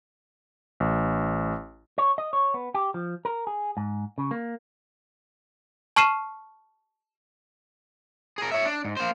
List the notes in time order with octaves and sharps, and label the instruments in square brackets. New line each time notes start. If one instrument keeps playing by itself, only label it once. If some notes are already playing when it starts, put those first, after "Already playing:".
[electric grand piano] A1
[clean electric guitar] C#5
D#5
C#5
B3
G4
F3
A#4
G#4
G#2
C#3
A#3
[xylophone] A5 C#6 F6 C7 D#7 E7
[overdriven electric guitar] G#4 A#4
C#5 E5
D4
G#2
A#3 C5